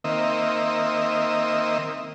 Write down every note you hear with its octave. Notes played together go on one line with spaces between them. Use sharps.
D#3 A#3 C4 D#5 E5